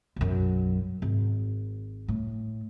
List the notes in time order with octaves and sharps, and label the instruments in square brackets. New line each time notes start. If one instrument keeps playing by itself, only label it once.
[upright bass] B1 F#2
G#1
A2